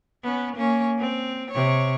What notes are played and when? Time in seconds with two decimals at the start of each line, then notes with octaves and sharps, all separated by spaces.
0.24 B3 C#4
0.56 A#3 C#4
0.99 C4
1.51 C3 C#5